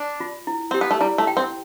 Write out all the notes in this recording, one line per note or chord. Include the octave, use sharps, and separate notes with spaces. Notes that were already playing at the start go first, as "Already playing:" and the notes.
Already playing: D4
F4
E4
C4 G4
B3
A3
G3 E4
A3
G5
C4